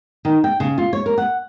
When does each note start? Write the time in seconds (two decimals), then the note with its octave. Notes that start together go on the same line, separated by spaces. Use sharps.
0.25 D#3
0.44 G5
0.60 C#3
0.78 F4
0.93 C#5
1.06 A#4
1.18 F#5